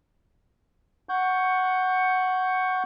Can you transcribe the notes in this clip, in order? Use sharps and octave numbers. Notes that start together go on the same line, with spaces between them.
F#5 C#6 G6